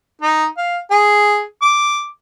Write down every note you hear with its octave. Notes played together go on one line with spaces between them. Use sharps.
D#4
F5
G#4
D6